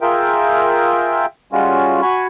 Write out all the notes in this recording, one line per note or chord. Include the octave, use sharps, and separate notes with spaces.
F4 G#4 A#4 E5 G5
G3 G#3 C#4 F4 F#4
F#4 G#5 B5 C#6